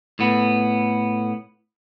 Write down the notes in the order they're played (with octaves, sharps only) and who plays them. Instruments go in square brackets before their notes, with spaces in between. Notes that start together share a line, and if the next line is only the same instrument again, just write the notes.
[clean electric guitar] A2 B3